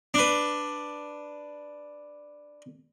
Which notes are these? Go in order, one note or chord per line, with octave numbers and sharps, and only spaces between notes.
D4 B4